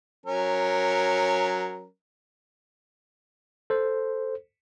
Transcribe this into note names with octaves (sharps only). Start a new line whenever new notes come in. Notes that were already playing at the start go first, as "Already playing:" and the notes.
F#3 C#4 A#4
A4 C5